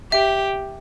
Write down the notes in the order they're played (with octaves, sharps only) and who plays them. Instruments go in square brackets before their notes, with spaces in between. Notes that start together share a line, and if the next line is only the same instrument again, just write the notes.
[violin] G4 [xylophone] E5